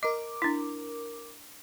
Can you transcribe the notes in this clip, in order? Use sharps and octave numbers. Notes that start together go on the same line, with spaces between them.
A#4 D#5 D6
D4 E4